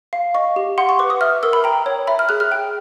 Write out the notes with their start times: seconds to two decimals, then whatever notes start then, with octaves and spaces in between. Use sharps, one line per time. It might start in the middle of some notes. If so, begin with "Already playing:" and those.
0.13 F5
0.35 D#5 C#6
0.56 G4
0.78 F#5 C6
0.89 C#6
0.99 B4 D6
1.10 D#6
1.21 E5 F6
1.43 A#4 E6
1.53 B5
1.64 G5 A#5
1.86 C#5
2.07 E5 B5
2.19 F6
2.29 G#4 F#6
2.40 F6
2.52 G5